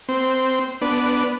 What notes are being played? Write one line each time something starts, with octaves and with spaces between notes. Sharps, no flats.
C4
B3 D4